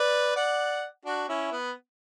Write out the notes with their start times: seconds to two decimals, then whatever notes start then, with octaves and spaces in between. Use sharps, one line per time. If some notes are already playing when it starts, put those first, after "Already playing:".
Already playing: B4 D5
0.36 D5 F#5
1.05 D4 F#4
1.29 C#4 E4
1.52 B3